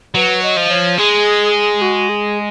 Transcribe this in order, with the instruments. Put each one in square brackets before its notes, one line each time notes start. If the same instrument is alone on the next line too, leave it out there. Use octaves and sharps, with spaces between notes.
[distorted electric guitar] F#3 [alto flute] B4
[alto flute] D#5
[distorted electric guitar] F3
[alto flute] C#5
[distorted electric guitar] G#3 [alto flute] G#4
[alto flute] F#4
G#4